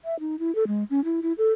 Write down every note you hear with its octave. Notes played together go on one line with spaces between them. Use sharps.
E5
D#4
E4
A4
G#3
C#4
E4
E4
A4